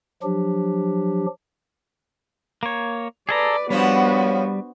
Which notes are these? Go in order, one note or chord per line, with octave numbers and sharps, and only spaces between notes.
F3 F#3 D4 G4
A#3 C#5
G#4 A4 B4 D5 A#5
F3 G3 B3 C#4 D4 F#4 C5